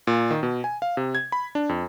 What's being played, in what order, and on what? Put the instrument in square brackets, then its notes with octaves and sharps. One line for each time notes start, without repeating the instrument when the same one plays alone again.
[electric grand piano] A#2
D#3
B2
G#5
F5
C3
G#6
B5
D4
F2